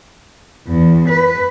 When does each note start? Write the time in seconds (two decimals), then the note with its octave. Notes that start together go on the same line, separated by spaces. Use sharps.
0.67 E2
1.08 B4